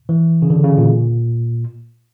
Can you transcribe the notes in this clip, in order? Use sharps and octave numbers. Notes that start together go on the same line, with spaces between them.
E3
C#3
D3
C#3
A#2